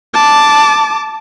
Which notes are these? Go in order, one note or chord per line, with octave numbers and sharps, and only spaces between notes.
A5 D6